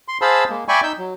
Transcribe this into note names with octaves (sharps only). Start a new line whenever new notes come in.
C6
G#4 C5 F5 A5 B5 E6
G#3 A#3
D5 E5 G5 G#5 B5 C#6
D#4 E6 G6
F#3